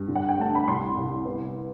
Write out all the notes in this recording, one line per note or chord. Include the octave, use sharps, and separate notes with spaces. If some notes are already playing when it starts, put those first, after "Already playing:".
Already playing: G2
D3
F#5
G5
A3 A5
B5
C2 C6
C2
B3